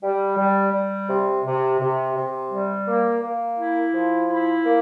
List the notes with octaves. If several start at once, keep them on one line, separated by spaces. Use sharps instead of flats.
G3
G3
G3
C3
C3
C3
C3
G3
A#3
A#3
E4
F3
E4
A#3